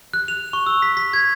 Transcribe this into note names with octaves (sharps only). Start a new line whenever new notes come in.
F#6
F7
C#6
E6
B6
B6
G#6